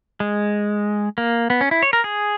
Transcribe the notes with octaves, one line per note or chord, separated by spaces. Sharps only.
G#3
A#3
B3
C#4
E4
C#5
A#4
G#4